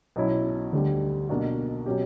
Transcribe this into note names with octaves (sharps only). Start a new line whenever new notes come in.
B1 B2 F#3 C#4 E4
D2 D3 G3
B1 B2 A#3 D4 F#4
B2 F#3 C#4 G4